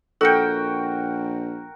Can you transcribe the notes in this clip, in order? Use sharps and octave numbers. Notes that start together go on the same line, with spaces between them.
A#1 F#4 A4 A#4 G5 C#7